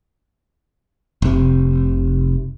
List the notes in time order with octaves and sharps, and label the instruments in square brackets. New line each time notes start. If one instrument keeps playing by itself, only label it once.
[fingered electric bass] F1 C3